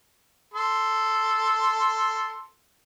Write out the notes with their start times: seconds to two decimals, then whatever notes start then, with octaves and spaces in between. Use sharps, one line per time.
0.54 A4 C6